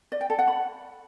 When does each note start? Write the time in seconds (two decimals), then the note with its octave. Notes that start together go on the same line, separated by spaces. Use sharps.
0.12 D5
0.21 G5
0.30 A4
0.39 F#5
0.48 B5